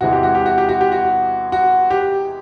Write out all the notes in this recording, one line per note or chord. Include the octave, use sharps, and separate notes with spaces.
E2 C3 E3 G#3 F#4
G4
F#4
G4
F#4
G4
F#4
G4
F#4
F#4
G4